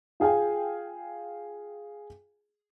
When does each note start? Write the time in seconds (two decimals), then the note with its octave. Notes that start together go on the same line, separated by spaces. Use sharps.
0.20 F4 G#4 F5 G5 G#5